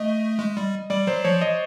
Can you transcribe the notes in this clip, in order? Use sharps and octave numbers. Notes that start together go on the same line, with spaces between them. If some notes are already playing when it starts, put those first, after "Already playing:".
Already playing: A3 D#5
G#3
G3
G3 D5
F#3 C5
F3 C#5
D#5